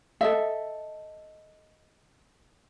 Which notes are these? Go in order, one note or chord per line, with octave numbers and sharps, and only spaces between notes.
A4 D#5 E5